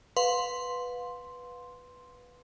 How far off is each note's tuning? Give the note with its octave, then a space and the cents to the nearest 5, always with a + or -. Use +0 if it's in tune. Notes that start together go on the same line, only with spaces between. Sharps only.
B4 +0 F5 +35 C6 +0